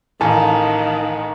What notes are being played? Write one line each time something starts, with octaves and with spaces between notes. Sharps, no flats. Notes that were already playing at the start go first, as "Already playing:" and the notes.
A1 D#3 F5 G#5 A5